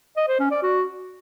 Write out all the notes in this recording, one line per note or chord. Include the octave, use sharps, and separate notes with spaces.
D#5
C5
C#4
D5
F#4